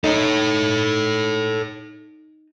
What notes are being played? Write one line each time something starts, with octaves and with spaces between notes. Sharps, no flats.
D#4 A4 C#5